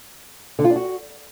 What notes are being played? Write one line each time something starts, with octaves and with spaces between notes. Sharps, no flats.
D3
F4
D4
F#4